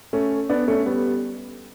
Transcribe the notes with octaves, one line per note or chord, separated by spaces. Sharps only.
A3 C#4
B3 D4
A3 C#4
G3 B3